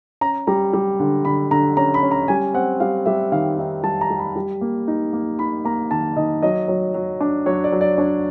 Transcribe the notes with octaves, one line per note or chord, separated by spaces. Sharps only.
C#4 A#5
G3 A#5
G3
D3
D3 B5
D3 A#5
C#4 A#5
B5
C#4
A#5
G3 G#5
C4 F#5
G3 F5
G3 E5
D#3 F5
D#4 E5
G3 A5
A#5
G3
B5
G3
A#3
D#4
A#3
D#4 B5
A#3 A#5
D#3 A5
D#3 D#5
F#3 D#5
F#3
F#3
D4
F#3 C#5
D5
F#3
D5
D4 C#5